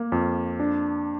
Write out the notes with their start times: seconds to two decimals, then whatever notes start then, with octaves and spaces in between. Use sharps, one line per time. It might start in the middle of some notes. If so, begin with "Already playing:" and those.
Already playing: A#3
0.12 F2
0.60 D4